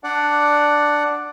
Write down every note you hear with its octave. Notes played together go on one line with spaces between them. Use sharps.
D4 D5 F#5